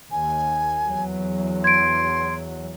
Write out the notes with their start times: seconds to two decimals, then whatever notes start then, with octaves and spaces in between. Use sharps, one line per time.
0.12 D#2 G#5
0.86 E2 F#3
1.64 C6 G#6 D7